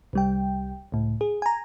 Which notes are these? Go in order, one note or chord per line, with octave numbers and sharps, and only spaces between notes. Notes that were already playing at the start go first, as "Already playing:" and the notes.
C2 G3 G5
C#2 A2
G#4
G#5 A#5